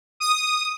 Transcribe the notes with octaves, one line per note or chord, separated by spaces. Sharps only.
D#6